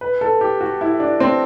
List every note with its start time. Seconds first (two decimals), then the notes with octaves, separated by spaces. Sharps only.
0.01 B4
0.21 A4
0.41 G4
0.61 F#4
0.81 E4
1.00 D4
1.20 C4